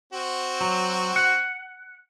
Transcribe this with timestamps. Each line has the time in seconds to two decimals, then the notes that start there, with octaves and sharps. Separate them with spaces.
0.13 C4 F#4
0.61 F#3
1.16 F#5